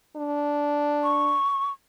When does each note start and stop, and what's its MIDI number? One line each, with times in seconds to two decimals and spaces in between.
0.16 1.36 62
1.02 1.69 85